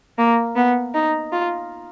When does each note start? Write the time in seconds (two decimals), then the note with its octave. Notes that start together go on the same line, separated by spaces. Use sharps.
0.18 A#3
0.56 B3
0.94 D#4
1.32 F4